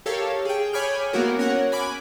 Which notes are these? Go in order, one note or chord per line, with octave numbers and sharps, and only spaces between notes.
G4 A4 A#4 C#5 F5 A5
G#4 G5
C#5 G#5 B5 D6 F6 G6
A#3 B3 E4 F#4 A#4
C#4 A#4 C#5 F#5
G#5 B5 D6